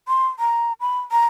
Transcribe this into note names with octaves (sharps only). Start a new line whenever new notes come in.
C6
A#5
B5
A#5